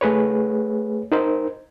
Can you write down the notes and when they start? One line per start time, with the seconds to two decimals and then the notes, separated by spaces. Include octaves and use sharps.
0.01 A3 G#4 B4 C#5
1.12 D#4 A#4 C5